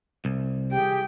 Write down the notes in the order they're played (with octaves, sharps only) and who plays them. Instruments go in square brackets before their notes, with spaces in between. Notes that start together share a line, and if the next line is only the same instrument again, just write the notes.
[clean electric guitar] C2
[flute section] G4 G#4 [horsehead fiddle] G5